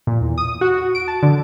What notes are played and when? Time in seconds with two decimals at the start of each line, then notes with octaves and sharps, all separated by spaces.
0.07 A#2
0.21 E2
0.38 D#6
0.61 F#4
0.95 D7
1.08 A5
1.23 D3